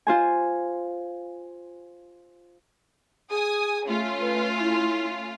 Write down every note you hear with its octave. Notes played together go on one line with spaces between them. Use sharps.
F4 C5 G#5
G#4 G#5 D#6
A3 C#4 F4
B4
E4